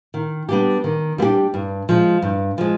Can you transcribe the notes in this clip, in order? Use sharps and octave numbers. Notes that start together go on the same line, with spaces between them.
D#3
G3 B3 D4 G4
D#3
G3 B3 D4 G4
G2
F3 G#3
G2
F3 G#3